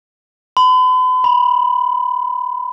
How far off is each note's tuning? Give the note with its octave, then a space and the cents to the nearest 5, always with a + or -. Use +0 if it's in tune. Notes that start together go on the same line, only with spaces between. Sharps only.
B5 +45
B5 -20